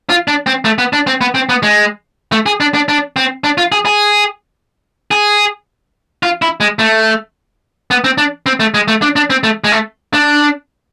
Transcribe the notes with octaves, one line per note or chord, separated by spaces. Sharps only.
F4
D4
C4
A3
B3
D4
C4
B3
C4
B3
G#3
A3
G#4
D4
D4
D4
C4
D4
F4
G#4
G#4
G#4
F4
E4
G#3
A3
B3
C4
D4
C4
A3
G#3
A3
D4
D4
C4
A3
G#3
A3
D4